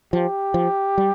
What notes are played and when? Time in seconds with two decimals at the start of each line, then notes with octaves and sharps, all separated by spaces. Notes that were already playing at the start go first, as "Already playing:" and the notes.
0.13 F3 G4
0.54 F3
0.98 G3